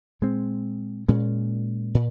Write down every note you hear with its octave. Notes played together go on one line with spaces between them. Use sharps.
A#2 G#3 C4
A#2 G#3 C#4
A#2